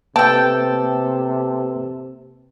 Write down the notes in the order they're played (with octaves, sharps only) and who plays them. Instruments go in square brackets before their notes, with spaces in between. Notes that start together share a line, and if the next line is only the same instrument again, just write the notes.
[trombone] C3 [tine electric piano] A#3 B4 E6 [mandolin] A4 G5 [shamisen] A5